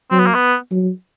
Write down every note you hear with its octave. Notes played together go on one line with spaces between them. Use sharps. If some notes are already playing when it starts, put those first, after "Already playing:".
F#3 C4
B3
A#3
B3
F#3